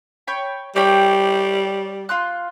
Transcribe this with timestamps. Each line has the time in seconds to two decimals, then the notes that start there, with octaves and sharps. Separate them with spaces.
0.27 C#5 G5 B5
0.76 G3 G4 C#5 G5
2.09 F4 C6 F#6